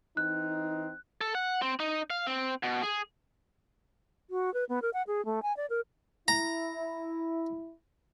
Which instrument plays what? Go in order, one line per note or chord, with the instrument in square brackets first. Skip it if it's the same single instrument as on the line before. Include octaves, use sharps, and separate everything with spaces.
[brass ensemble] E3 C4 D#4 [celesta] F#6
[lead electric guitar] A4
F#5
C4
D#4
F5
C4
B2
G#4
[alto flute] F#4
B4
B3
A#4
F#5
G#4
A3
G#5
D5
A#4
[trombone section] E4 [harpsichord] A#5